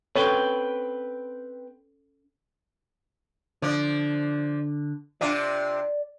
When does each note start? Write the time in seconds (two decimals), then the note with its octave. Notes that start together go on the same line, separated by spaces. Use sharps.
0.16 C4 C#4 A4 B4 C#5 G5
3.62 D3 F3 D5
5.21 C3 D4 F4 D5